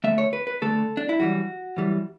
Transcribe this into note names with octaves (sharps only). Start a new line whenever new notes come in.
D2 D3 A3 E5
C#5
B4
B4
D2 D3 A3 A4
D4
E4
F#2 E3 G3 F#4
F#2 E3 G3